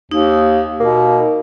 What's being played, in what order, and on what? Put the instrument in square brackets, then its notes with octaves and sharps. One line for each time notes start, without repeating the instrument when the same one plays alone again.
[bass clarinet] D#2 [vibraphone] D#4
[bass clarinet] B2 [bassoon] A#3